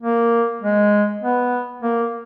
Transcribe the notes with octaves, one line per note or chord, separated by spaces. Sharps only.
A#3
G#3
B3
A#3